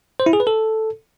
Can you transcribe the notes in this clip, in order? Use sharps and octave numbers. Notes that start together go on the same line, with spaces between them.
C5
E4
G#4
B4
A4